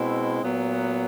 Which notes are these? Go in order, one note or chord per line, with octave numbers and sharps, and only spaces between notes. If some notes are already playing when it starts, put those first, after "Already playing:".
Already playing: B2 G#3 C4 E4
A#2 F#3 B3